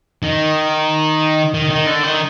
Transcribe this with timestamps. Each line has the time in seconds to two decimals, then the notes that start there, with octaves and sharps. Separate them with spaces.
0.23 D#3
1.54 D#3
1.70 D#3
1.87 D3
2.03 D#3